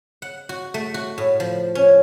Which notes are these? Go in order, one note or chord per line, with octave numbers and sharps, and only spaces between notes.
F#5
F#4
A3
F#4
A2
F3
C#4